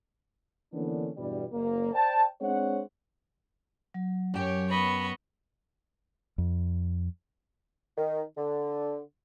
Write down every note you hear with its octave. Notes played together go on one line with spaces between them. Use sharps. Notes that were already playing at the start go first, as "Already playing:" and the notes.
D3 E3 A#3 B3 C#4 D4
E2 G2 B2 G3
F#1 A#3
C5 D5 G5 A5
G#3 C4 D4 C5 C#5 F#5
F#3
F#2 G4 C#5 G5
B3 D#5 B5 C#6
F2
D#3
D3